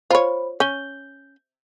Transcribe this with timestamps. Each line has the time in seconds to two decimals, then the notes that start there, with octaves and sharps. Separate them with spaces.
0.11 F4 C5 C#5 B5
0.60 C#4 G6 G7